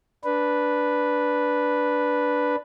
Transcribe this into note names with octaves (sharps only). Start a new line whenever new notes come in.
D4 B4